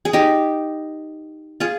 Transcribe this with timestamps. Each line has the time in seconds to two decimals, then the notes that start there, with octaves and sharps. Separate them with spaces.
0.05 G#4
0.13 D#4 G4
1.60 F4 G#4